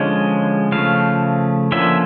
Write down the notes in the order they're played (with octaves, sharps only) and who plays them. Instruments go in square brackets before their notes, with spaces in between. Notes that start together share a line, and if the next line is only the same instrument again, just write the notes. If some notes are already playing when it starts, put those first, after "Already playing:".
Already playing: [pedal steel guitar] D3 F3 G#3 C#4
C#3 F3 A3 F5
D3 F3 A#3 C#4 E5